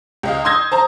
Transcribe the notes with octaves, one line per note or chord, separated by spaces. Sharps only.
C#2 D#5 F5
C6 D#6 E6 G6 G#6 A#6
C5 A5 A#5